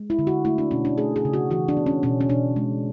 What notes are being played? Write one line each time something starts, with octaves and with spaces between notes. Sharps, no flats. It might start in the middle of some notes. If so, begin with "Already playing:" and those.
Already playing: G#3
E4
D3
F#4
A3 E4
D4
B2 C#4
D4
A3 G#4
G#4
C#3
F#4
E3 F#4
D4
B3
C#4
B2 C#4
C#4
B2 D4
G#3